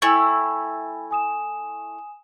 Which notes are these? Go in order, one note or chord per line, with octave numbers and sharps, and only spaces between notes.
A3 E4 G5 G#5 B5
G#5 D#6 E7